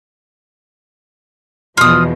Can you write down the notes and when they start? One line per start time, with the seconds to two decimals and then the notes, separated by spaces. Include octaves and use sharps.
1.77 E2 B2 F3 F4 D#6